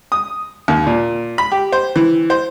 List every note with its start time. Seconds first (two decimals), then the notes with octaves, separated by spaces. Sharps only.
0.12 D#6
0.68 D#2
0.87 A#2
1.38 B5
1.52 G4
1.72 C5
1.96 E3
2.30 C5